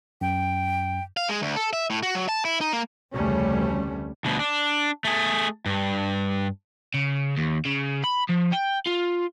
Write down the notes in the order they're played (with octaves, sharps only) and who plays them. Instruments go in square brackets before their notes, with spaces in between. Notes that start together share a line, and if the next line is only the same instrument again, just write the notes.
[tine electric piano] F#2 [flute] G5
[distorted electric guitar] F5
G#3
D2
A4
E5
A2
F#4
F#3
A5
E4
D#4
A#3
[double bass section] F1 D2 C#3 G3 A3 C#4
[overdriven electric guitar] D2 B2
D4
A3 G#4
G2
C#3
D#2
C#3
B5
F3
G5
F4